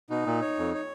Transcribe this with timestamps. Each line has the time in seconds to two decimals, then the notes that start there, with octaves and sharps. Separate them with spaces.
0.10 B2 D#4
0.26 A#2
0.42 C#5
0.58 F2
0.75 C#5